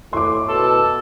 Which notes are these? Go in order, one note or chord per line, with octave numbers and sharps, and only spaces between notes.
A2 C6 D6
B2 A4